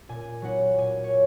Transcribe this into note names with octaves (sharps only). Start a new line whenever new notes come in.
A#2 G#5
F#3 B3 D#4 F#5
A#2 G#5
C#5